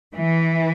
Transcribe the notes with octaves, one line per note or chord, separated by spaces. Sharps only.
E3